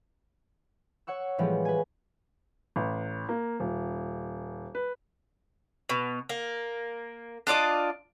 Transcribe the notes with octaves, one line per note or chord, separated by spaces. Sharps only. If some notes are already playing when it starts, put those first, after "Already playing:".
C#5 F#5 C#6 E6
A2 E3 F3 G3 G#3 B3
B4 G#5
A1
A#3
D#1
B4
B2
A#3
D4 F4 D5 D#5